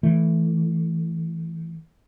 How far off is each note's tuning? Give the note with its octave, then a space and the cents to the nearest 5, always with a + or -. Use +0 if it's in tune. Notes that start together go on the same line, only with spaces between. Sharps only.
E3 +0 A3 +0